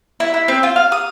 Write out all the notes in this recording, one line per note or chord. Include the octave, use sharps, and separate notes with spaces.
E4
E4
C4
F4
F5
D#6